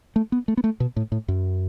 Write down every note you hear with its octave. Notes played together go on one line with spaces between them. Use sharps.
A3
B3
A3
B3
A3
B2
A2
A2
F#2